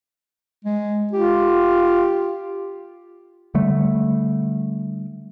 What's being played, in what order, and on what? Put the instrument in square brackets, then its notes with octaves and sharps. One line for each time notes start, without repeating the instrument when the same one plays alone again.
[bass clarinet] G#3
[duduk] F4 [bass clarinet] G4
[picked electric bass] D3 G3 A3